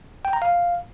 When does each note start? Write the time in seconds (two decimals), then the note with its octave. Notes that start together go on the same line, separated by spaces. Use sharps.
0.25 G5
0.33 A#5
0.42 F5